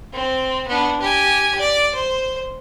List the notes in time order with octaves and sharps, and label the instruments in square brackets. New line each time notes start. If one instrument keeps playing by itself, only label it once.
[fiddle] C4
B3 D4
G4 G#5
D5
C5